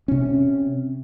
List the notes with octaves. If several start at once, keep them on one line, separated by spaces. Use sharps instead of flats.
C3 C#4